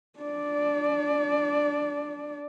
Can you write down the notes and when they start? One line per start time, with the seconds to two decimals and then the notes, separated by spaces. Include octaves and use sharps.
0.19 D4 D5